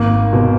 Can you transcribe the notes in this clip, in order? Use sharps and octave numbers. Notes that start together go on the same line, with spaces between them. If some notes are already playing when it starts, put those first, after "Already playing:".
Already playing: G#1 A#3
B2